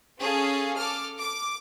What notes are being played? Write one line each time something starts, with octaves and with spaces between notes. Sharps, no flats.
C#4 G#4 A4 F5
A4 D6 F6
D6